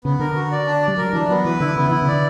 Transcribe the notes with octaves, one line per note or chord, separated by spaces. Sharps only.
C#3 B3
D3 A#4
F#4
D5
D4
D5
G3
F#3 A#4
E3 D4
F#3 B3
E3 B4
D3 E4
C#3 B3
E3
D3 E4
C#3
D3 D5